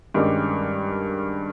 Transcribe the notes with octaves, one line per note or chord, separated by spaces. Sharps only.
G2 D#3 G3 G#3 C#4 G4